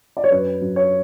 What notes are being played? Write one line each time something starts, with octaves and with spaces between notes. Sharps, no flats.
D5
C#5
F#2 B4
F#2
C#5